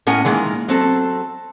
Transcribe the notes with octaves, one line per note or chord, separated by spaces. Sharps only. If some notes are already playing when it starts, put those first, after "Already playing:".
A2 C#4 A#4 F#5 G#5
D#3 E3 G#3 A#3
F#3 C4 A4